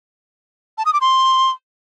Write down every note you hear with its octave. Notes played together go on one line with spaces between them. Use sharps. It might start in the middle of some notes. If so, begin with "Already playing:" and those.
A5
D#6
D6
C6